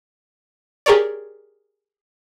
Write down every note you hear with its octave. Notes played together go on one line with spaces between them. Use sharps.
G4 G#4 A#4 C#5 D5